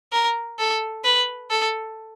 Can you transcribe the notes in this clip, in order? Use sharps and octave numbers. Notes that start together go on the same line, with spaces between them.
A#4
A4
B4
A4